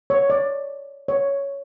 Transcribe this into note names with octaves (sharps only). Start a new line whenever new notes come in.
C#5
D5
C#5